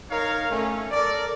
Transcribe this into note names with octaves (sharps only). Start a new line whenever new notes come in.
D#4 A#4 C#5 F5
A3 C#4
A4 A#4 D5